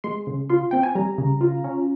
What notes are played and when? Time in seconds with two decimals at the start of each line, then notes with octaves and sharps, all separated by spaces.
0.04 G#3 C6
0.27 C#3
0.49 F4 C6
0.71 C4 G5
0.83 G#5
0.95 G3 A#5
1.18 C#3
1.41 F4
1.64 C#4